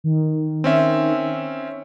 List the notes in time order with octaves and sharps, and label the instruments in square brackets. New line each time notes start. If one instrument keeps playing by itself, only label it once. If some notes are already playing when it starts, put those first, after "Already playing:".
[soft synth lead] D#3
[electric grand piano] C4 C#4 E5